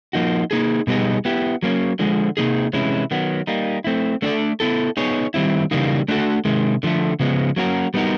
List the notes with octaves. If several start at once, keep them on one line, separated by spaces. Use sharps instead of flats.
F3 A#3 D#4 F#4
A#3 D#4 G#4
B2 G3 B3 D#4 G#4
B3 E4 G4
F#3 A#3 C#4
D3 F3 G#3
C3 F3 A#3 D#4 G#4
C3 E3 G#3 C#4 E4
D#3 F#3 B3
G3 A#3 D#4
A3 C4 E4
A3 D4 F#4 A4 D5
B3 E4 A4
B3 D#4 G#4 C#5
D#3 G3 C4 E4
C#3 E3 G3 A#3 D#4
A3 D4 F#4 A4
C3 D#3 G#3
D3 F3 A3
C#3 F3 G#3 B3
F#3 A#3 C#4 F#4 A#4
G3 B3 D#4 F#4 A#4